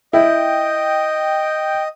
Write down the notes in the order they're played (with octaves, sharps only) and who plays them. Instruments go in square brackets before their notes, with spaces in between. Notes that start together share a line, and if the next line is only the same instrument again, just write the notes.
[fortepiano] E4 [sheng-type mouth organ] D#5 [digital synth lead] G5